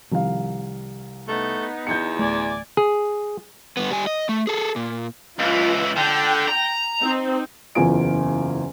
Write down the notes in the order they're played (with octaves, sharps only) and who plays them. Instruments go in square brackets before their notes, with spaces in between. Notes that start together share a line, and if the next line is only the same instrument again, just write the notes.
[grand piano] C2 F5 [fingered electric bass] D#3 F3
[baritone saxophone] A3 [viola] B3 D#4
[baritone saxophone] E2 [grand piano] G6 C#7
[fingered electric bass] D1 A3 [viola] D5 G#5
[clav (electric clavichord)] G#4
[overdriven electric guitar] G2 B3
G3 G#5
D#5
A3
G#4 A4
A#2
[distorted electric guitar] C#2 E3 [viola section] F4
[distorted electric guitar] D3 [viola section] G5
[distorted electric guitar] A#5
[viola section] C4 D#4
[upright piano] F#1 E2 F4 G#5 D7